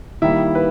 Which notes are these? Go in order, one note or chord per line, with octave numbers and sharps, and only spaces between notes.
D#3 G3 A#3 E4 E5
B4